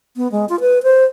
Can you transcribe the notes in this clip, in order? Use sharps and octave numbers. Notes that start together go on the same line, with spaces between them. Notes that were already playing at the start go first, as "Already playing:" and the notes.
B3
G#3
F4
B4
C5